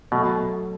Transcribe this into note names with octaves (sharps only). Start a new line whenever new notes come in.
B2 F#3 A3